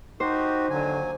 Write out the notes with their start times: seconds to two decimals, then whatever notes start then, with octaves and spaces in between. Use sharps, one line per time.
0.20 D#4 F#4 G4 C5
0.70 D#2 D3 F#3 G#5